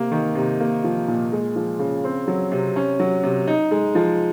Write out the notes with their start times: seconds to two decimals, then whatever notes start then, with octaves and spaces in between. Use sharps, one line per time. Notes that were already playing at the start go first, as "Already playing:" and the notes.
Already playing: C3 A#3
0.11 D#3
0.35 C3
0.60 A#3
0.84 F3
1.08 A#2
1.32 G#3
1.56 F3
1.79 C#3
2.04 C4
2.28 F#3
2.52 C3
2.76 C#4
3.00 F#3
3.23 C3
3.48 D#4
3.71 G#3
3.95 F3